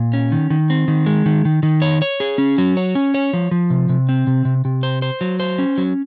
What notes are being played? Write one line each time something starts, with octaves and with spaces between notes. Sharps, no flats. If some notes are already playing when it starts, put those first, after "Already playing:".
Already playing: A#2
C#4
D#3
D#3
C4
D#3
G#3
D#3
D#3
D#3
C#5
C#5
G#4
C#4
F#3
C#5
C#4
C#5
F3
F3
C3
C3
C4
C3
C3
C3
C5
C5
F#3
C5
C#4
F#3